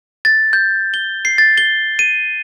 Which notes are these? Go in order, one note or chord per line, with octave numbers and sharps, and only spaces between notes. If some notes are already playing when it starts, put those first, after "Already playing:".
A6
G6
G7
C7
A6
G7
D#7